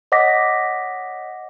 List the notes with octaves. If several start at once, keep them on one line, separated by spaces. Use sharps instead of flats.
C#5 D#5 F#5 D6 A#6 B6